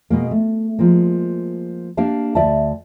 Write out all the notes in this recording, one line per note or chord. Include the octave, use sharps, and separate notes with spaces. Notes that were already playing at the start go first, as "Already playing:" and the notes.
B2 G#3 A#3
A3
F3 G#3 A#3
A#3 D4 G4 F5 A5
D2 D5 E5 A5